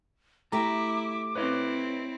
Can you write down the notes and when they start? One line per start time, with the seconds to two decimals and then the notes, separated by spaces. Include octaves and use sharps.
0.52 A3 E4 G4 E5 A#5 D6
1.35 C4 E4 B4 C#5 D#5